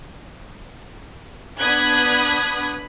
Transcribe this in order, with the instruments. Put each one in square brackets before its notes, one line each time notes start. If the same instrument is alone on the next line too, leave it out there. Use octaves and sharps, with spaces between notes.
[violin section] B3 D4 B5 D#6 F#6 G#6